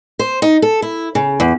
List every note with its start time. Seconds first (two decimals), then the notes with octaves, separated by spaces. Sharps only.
0.19 C5
0.42 D#4
0.62 A4
0.82 E4
1.15 C#3
1.40 E2